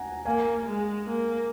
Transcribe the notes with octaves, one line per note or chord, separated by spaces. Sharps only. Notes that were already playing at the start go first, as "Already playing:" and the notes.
Already playing: F#5 G#5 A#5
A#3 F5 G#5
G#3
A#3